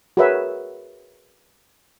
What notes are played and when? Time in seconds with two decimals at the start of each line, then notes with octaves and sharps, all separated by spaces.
0.17 F#4 G#4 A#4 B4 C#5 E5